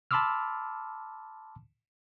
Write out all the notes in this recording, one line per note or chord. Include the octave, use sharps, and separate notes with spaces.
A5 B5 C6 D6 E6 F6